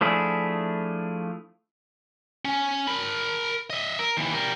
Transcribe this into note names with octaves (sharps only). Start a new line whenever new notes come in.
F3 A3 D4 E4 G#4
C#4
A#4 B5
D#5 E5
A#4
D#2 E3
G3 A#4